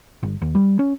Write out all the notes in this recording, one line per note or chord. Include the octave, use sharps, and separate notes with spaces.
G1
D#2
G3
C#4